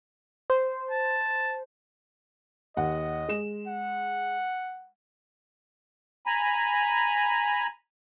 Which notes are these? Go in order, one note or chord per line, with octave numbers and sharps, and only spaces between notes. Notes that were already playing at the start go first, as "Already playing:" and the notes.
C5
A5
D#2 D#5 F#5
G#3 E7
F#5
G#5 A#5 B5